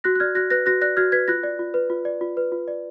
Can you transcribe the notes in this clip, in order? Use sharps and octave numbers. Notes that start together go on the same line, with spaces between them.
F#4 F#6 A#6
F#6
D5 F6 G#6
F#4 F#6 A#6
B4 F#6 A#6
F#4 F#6 A#6
D5 F#6 A#6
F#4 F6 G#6
B4 G#6 B6
F4 F#6 A#6
D5
F4
B4
F4
D5
F4
B4
F4
D5